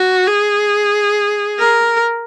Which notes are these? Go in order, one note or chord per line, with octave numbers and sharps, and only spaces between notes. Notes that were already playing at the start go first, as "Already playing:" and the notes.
Already playing: F#4
G#4
A#4